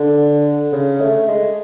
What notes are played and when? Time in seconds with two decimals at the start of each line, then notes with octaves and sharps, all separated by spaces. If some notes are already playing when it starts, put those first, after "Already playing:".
Already playing: D3
0.72 C#3
1.01 A3
1.28 G#3